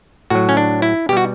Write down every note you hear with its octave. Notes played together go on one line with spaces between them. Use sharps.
A2 F#3 F#4
C#4
D4
E4
B2 G3 F#4 G4